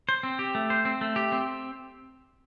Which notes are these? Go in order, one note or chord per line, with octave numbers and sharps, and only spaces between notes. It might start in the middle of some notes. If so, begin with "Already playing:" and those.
C5
C4
G4
A3
C5
C4
A3
G4
C4